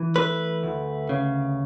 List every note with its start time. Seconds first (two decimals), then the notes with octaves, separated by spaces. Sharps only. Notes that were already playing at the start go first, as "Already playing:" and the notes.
Already playing: E3
0.16 A3 B4
0.63 D2
1.09 C#3